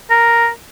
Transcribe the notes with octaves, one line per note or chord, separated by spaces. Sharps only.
A#4